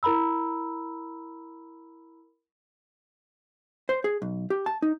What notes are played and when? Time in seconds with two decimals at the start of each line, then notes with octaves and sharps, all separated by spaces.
0.03 E4 A#4 A#5 B5 E6
3.89 C5
4.04 G#4
4.22 B1
4.50 G4
4.66 A5
4.82 D#4